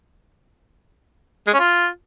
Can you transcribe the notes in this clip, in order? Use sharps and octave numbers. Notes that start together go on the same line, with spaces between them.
G#3
C#4
F4